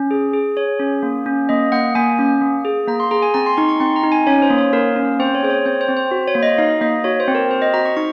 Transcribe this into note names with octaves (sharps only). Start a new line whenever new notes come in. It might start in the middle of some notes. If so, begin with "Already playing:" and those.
Already playing: C#4
G#4
G#4
G#4 C#5
C#4
A#3
C#4
A#3 D#5
A#3 F#5
A#3 G#5
C#4
A#3
G#4
A#3 A#5
C6
G#4 A#5
G#5
C4 A#5
C6
D#4 C#6
C#6
C4 C6
A#5
D#4
G#5
C#4 C#5
C5
A#3
C#5
A#3 A#4
C#4
C4 C5
C#5
G#4 C5
C#5
C4 C5
C5
C4
C5
F#4
C#5
A#3
D#5
D#4 F5
A#3 D#5
F#4 C#5
C5
C4
A#4
C4 C5
D#5
F#4 A#5
C#6
D#4 C#6